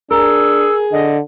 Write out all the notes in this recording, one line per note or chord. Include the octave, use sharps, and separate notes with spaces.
D4 G#4 A#4 E6
D3 D#5